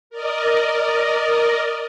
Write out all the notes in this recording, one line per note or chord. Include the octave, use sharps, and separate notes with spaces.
A#4 D5 D#5